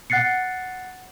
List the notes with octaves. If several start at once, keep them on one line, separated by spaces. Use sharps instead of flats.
F#5 F#6 A6 C7 C#7